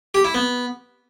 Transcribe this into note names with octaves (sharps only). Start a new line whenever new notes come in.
G4
E4
B3